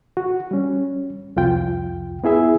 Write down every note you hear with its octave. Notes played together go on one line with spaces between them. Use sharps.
F#4
G3 C#4
C2 F2 F4 G5
B3 E4 G#4 E5